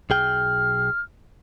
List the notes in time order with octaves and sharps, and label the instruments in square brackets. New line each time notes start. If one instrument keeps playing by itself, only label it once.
[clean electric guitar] B1 G#4 G5 [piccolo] F6